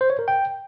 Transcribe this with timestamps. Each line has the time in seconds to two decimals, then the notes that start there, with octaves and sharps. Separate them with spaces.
0.01 C5
0.10 C#5
0.19 A#4
0.28 G5